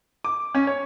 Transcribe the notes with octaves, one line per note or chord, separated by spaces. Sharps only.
D6
C#4
C#5